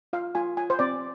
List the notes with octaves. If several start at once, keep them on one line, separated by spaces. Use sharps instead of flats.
F4 F5
F4 G#5
F4 G#5
C5
C4 D5